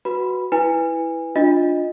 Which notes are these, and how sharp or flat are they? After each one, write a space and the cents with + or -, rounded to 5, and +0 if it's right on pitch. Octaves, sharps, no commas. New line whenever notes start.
F#4 -5 B4 +0 B5 -5
E4 +0 B4 +0 G#5 -25
D4 +0 F4 +15 D#5 +0